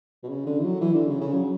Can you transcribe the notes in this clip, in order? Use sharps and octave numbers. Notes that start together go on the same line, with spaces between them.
B2
C#3
D3
E3
F#3
E3
D3
C#3
C#3
F#3